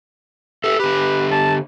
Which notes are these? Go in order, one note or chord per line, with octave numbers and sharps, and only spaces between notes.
G4 A4 E5
D3 G4 B4
A5